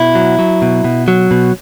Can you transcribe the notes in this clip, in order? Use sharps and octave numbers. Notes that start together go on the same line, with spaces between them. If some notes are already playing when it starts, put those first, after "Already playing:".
Already playing: B2 E4
F#3
F#3
B2
B2
F#3
B2